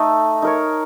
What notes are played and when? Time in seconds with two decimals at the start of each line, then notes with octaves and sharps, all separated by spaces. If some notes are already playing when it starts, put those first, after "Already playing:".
Already playing: A3 D#4 A4 D#5
0.42 D#4 A#4 C#5